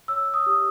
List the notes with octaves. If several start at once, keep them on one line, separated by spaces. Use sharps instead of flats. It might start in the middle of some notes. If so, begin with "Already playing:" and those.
C#5 E6
D#6
G4